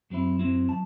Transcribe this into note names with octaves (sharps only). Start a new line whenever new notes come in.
F#2 F#3 C4 E4
F#2 F#3 C4 E4
F#3 A5